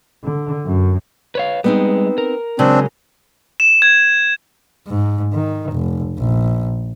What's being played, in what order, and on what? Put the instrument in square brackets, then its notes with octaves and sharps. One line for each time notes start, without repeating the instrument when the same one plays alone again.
[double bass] D3
F#2
[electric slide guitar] B4 C#5 F5
[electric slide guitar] G3 G#3 [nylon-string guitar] B3 C4 D#4
[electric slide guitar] A#4
[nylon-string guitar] C#3 F#3 G#3 [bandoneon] C4 D4
[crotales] E7
G#6
[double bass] G#2
D#3
F1
A#1